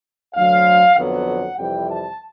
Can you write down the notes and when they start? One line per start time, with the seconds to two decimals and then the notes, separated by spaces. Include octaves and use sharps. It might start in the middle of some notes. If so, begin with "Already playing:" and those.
0.35 D2 D3 F#3 F5
0.97 F2 D3 F#3 B3 F#5
1.58 F2 C3 E3 G3 G5
1.90 A5